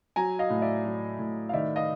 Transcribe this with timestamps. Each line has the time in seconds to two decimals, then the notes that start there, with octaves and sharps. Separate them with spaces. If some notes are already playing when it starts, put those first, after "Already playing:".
0.16 F#3 G#5 A#5
0.39 D#5 F5
0.50 A2
0.62 D5 E5
0.85 F#3
1.19 A2
1.49 F5
1.53 D#3 D5 E5
1.76 D#5 F5